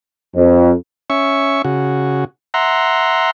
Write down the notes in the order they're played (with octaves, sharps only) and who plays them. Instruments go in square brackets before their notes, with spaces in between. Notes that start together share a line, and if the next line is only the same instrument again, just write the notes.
[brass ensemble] F2
[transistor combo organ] C#4 E5 C#6
C#3 F#4
E5 F#5 A#5 C6